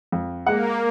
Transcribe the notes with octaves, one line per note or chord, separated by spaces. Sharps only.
F2
G#3 A#3 F#5